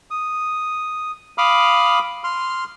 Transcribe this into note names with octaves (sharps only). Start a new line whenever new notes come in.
D#6
F5 B5 D6 D#6 F6
C6 F6